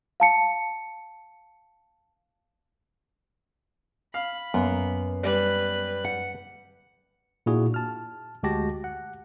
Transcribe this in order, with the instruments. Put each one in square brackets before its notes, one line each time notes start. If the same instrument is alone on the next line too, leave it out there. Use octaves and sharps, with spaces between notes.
[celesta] F5 A5 C#7
[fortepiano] F5 [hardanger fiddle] B5
[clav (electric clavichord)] F#2 [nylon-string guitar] A#3 B3
[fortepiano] G3 [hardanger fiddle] B4
[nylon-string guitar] F#5
[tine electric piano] A#2 D4 E4 F#4 G#4
A5 F6
D2 G#3 F#4 G4 A5 A#6
F#5